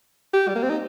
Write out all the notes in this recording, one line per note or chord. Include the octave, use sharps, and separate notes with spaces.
G4
G3
A#3
C4
D#4